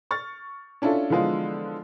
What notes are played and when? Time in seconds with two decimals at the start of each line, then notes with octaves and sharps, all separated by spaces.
0.11 C#6 F6 A6
0.82 C#4 D4 E4 F4 A4
1.10 D3 E3 F3 G#3 B3 F4